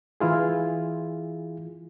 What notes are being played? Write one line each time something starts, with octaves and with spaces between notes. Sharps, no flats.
E3 E4 F4 G#4